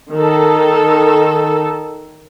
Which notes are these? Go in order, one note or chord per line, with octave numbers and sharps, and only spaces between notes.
D#3 A4